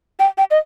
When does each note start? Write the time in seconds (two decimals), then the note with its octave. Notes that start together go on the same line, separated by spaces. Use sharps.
0.20 G5
0.38 G5
0.51 D#5